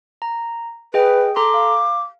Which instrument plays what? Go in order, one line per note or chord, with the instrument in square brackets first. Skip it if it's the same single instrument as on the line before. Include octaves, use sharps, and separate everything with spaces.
[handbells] A#5
[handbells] G#4 D#5 G5 [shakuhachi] B4
[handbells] A4 A#5 C6 [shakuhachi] D6
[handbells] F5